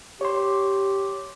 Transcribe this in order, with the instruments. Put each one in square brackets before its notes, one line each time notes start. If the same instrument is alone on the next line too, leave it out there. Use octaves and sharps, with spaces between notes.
[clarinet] G4 [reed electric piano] C#5 C6